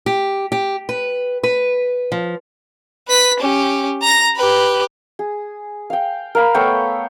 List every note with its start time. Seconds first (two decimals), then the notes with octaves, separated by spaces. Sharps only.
0.06 G4
0.52 G4
0.89 B4
1.43 B4
2.12 F3
3.08 B4 B6
3.40 C#4 G4
4.01 A#5 A#6
4.36 G4 B4
5.19 G#4
5.90 F5 G5
6.35 A#4 F5 B5
6.54 A3 B3 C#5 G5